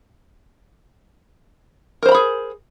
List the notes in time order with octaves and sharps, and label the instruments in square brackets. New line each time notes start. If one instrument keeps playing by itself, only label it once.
[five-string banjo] A#4
C5
A#5
B5
G#4